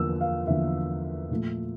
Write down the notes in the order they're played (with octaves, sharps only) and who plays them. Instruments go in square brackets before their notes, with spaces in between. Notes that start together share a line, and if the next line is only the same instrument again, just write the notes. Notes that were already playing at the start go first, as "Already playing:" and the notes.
Already playing: [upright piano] E2 D3 F3 A#3 E6
F5
E2 D3 F3 A#3 E5
A#2 F3 A3